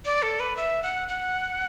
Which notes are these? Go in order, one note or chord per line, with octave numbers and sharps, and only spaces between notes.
D5
A4
B4
E5
F#5
F#5